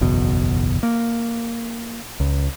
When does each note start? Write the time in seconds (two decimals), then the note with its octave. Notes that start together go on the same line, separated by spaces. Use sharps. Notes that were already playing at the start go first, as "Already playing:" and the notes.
0.01 F#1 B1 E2 B2
0.83 A#3
2.20 C#2